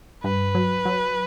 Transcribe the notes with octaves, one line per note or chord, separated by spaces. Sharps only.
G2 B4
F#3
F#3